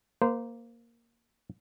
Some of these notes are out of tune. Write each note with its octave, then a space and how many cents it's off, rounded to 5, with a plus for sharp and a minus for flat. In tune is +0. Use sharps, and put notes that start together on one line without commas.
A#3 +0 C5 -20